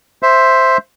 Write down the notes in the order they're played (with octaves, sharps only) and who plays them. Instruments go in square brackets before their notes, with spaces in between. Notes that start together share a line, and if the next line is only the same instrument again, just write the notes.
[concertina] C5 E5